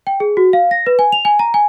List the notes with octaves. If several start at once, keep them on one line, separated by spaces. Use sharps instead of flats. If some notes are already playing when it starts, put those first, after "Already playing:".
G5
G#4
F#4
F5
A#6
B4
G#5
F7
G#5
A#5
G#5